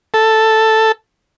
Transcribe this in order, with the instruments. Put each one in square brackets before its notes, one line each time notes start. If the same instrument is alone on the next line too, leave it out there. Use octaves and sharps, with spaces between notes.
[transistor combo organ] A4